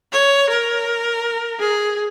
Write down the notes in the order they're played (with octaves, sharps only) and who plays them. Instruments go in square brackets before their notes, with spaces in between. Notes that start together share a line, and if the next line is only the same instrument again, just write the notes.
[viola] C#5
A#4
G#4